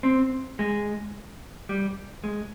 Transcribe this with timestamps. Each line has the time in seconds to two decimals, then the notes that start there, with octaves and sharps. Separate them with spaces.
0.03 C4
0.59 G#3
1.69 G3
2.24 G#3